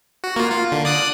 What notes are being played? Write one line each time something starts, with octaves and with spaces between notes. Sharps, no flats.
F#4
A#3 F4
F4
D3
D5 D#6 F#6